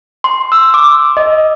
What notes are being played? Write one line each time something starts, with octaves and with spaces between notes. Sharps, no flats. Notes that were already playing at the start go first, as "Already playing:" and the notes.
C6
E6
D6
D#5